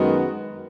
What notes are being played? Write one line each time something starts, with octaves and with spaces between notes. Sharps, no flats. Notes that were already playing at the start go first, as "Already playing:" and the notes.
Already playing: F#2 D#3 G#3 B3 F#4